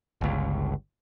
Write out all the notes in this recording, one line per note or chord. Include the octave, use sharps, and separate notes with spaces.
G1 C#2